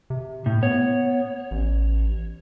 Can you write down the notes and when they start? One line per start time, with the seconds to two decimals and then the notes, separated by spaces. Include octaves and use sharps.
0.10 C3
0.46 A2
0.63 B3 C#5
1.51 A1